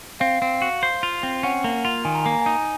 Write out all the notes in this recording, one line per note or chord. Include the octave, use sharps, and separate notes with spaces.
C4 F5
C4
F#4
C5
F4
C4
C#4 F#5
A#3
F4
D#3 G#5
A#5
A#3 G#5
A#5
D#4 G#5